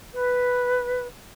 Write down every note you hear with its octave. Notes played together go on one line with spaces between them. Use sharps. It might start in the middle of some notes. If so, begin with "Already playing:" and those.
B4